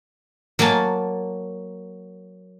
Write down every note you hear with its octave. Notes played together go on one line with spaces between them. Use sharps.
F#3 A#3 G#5 A5